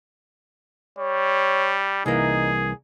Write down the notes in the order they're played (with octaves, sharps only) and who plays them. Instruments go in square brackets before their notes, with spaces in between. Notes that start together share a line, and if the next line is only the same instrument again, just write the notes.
[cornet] G3 [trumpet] C#5
[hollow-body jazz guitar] C2 E3 A#3 [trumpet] D#4 [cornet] G#4